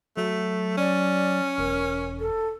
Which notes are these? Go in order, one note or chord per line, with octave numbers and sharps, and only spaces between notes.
F#3 A3
C#4 D5
E1 A#4
A4